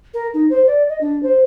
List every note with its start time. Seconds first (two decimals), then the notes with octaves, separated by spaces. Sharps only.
0.14 A#4
0.34 D#4
0.50 C5
0.67 D5
0.89 D#5
1.01 D4
1.23 C5